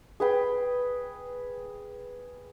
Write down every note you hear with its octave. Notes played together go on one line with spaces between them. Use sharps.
G#4 B4 G5